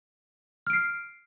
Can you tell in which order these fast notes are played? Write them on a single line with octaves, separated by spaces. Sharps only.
F6 D7 C7